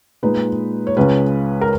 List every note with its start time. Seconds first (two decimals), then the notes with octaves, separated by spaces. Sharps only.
0.23 A#2 G#3 D#4 B4
0.87 C#5
0.97 C#2 C#3 G#3 C#4 B4
1.61 A#4